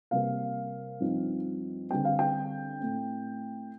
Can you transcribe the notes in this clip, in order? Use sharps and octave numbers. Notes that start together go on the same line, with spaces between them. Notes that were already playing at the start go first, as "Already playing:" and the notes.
C3 G3 A#3 F5
G2 F3 C4 D#4
D3 G3 C4 G5
F5
G5
A2 A3 C4